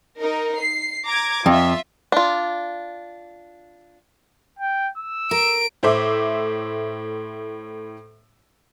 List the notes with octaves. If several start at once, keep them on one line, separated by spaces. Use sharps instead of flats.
D#4 A#4
C7
A#5 D6 G#6
F2 F4 E5
D4 F4
G5
E6
A#4 D7
A2 C5 E5 D6